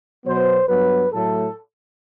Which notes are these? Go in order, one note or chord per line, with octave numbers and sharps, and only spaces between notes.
B2 F#3 B3 C5
G2 F#3 B3 B4
A2 F#3 A3 A4